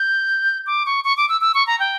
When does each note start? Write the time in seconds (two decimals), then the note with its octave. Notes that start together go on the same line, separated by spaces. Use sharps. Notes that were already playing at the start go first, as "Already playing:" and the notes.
Already playing: G6
0.67 D6
0.86 C#6
1.04 C#6
1.17 D6
1.29 E6
1.41 E6
1.54 C#6
1.67 A#5
1.80 G5